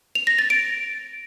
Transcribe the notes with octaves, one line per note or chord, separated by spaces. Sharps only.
F7
A#6
A6
D7